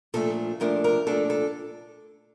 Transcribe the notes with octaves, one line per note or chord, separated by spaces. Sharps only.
A#2 F3 A3 D4 A4
A#2 F3 A3 D4 A#4
A#4
A#2 F3 A3 D4 A4
A4